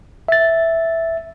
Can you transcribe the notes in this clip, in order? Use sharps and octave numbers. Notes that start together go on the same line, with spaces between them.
E5 A6